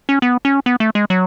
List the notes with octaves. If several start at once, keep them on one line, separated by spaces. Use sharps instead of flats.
C#4
B3
C#4
B3
A3
G#3
F#3